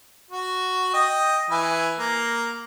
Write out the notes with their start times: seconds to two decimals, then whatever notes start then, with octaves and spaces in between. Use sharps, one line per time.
0.31 F#4
0.94 D#5 G5
1.51 E3 B4 G#5
1.99 A#3